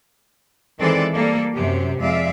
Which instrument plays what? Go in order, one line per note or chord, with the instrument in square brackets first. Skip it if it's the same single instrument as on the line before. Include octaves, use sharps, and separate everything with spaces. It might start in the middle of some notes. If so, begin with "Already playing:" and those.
[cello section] D#3 E3 G#3 C4 A4 D5
G3 A#3 A4 D5
F#2 C3 G4
F2 G#3 D5 E5 F5